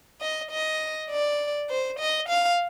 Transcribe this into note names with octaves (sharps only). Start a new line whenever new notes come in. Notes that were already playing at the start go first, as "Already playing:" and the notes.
D#5
D#5
D5
C5
D#5
F5